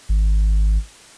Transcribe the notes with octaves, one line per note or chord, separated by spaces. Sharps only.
G#1